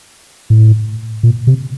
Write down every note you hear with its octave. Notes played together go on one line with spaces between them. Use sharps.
A2
A#2
C3